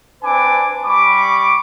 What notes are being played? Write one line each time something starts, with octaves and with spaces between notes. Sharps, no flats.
C4 D4 B4 G#5 D6
G3 B5 C#6 D6